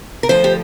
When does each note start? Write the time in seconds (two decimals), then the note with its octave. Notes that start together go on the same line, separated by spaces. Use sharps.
0.23 A#4
0.29 D2 D3 F3 C5
0.44 G4